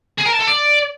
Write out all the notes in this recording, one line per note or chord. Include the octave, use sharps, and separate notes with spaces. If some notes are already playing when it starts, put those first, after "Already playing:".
G#4
A#4
A5
A4
D5